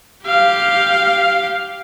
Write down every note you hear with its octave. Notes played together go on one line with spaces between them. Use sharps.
G4 F5